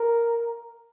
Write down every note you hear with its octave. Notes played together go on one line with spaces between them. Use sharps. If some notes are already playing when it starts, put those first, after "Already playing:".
Already playing: A#4